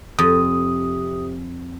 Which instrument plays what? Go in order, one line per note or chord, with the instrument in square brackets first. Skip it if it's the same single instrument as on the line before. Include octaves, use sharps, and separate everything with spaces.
[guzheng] F2 [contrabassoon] C3 [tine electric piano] D#6